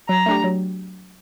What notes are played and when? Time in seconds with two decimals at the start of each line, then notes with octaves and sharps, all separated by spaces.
0.09 F#3 A#5
0.26 A3 D4 G4
0.44 F#3